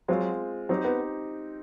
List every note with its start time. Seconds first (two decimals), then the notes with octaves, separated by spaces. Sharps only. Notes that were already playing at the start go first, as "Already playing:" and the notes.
0.08 F#3 G#3 C4 F4
0.69 F#3 C4 D#4 G4
0.84 B3